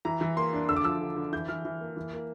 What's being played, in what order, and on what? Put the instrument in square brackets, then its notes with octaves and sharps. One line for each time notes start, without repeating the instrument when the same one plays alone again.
[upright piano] E3 A#5
E3
A#3 C6
D4
D3 E6
D6
F3 E6
D3
D3
E3 G6
E3 F6
E3
A#3
E3
A#3